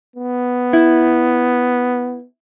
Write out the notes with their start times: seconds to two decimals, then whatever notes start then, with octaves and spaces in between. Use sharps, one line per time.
0.16 B3
0.73 E4